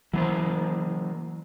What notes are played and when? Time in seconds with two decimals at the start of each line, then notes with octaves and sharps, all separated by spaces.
0.13 E3 F#3 A#3 C5